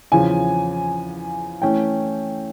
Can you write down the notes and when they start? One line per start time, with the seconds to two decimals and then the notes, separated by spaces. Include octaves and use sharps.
0.12 E2 C#3 F3 G#5
1.62 E3 A3 C#4 G5